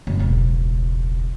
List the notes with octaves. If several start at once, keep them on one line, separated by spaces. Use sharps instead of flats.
F#1
E1 C#2